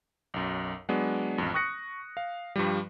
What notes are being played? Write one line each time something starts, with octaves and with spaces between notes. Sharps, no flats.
B1 F#2
F#3 G#3 B3 D4
A1 F2
C#6 D#6 F#6 A#6 C#7
F5
G2 F3 G3